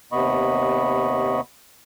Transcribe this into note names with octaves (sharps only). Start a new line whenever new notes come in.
D#2 C3 B3 D#5 B5 C#6